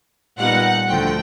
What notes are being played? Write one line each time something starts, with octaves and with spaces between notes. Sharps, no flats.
A#2 G3 B3 D#4 F#5
D2 D3 F3 A3 G5